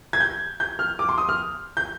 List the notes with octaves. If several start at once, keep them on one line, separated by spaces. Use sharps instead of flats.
G#6
G6
G6
F6
D6
C6
D#6
F6
G6